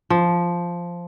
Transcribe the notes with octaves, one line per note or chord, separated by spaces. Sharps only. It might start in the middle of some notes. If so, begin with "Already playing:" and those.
F3